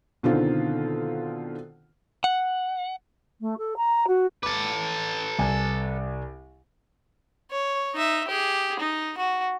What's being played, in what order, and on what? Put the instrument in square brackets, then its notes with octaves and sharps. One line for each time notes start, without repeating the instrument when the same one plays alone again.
[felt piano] B2 D3 D#3 C4 F4
[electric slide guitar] F#5
[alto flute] A3
A4
A#5
F#4
[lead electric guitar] A4 B4 [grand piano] D6
[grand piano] C2 G#5
[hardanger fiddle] C#5
D#4 E5
G4 G#4
D#4
F#4